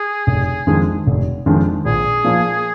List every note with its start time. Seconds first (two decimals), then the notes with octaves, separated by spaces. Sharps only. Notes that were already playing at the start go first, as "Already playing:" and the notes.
Already playing: G#4
0.27 F1
0.67 F2 D#3 G#3 D4
1.06 F1
1.46 F2 D#3 G#3 D4
1.85 A#1 G#4
2.25 A#2 F3 A#3